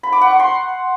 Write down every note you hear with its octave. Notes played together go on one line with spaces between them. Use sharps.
B5
D6
F#5
C#6
C6